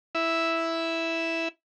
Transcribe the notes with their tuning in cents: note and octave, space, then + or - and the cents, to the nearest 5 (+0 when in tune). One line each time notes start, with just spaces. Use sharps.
E4 +0 E5 +0